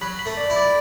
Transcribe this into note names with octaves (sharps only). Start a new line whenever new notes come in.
F#3 B5
B5
A3
D5
E4
D5